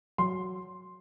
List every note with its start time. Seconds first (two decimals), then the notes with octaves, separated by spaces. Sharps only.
0.18 F#3 C6